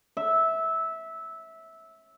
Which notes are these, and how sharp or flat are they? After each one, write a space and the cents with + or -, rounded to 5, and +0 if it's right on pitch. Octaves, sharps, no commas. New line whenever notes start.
E5 -15